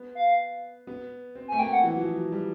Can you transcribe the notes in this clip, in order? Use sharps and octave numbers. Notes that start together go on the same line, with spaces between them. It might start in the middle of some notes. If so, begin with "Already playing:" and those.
Already playing: B3
F5
B3
C4
G#5
A3
A#3 G5
F#5
E3
F#3
F3
F#3
G3